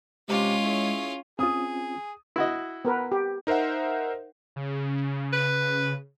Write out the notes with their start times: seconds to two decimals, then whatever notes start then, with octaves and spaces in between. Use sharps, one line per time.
0.28 C3 G#3 C#4 F4 G4
0.64 E4 G#4 C#5
1.39 C4 C#4 F4 G#4 D#6
2.36 E4 F#4 D#5
2.85 B3 A#4 B4
3.12 G4
3.47 D#4 A#4 C5 E5 F#5
4.56 C#3
5.33 B4